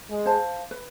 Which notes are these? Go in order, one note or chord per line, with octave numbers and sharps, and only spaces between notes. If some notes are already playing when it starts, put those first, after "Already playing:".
G#3
C5 F5 A5
B4